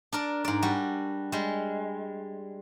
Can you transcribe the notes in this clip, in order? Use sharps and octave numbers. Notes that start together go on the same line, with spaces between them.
D4 A#4 D5
G#2 D5
G3 F#4
G3 G#3